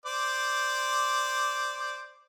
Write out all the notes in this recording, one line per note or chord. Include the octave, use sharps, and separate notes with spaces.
C5 D5 D6